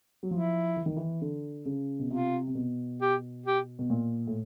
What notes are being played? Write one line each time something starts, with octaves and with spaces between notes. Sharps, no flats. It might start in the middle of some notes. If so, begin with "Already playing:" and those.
F#3
F3 E4
E3
D#3
E3
D3
C#3
B2
C3 F4
C3
B2
G4
G4
B2
A#2
A2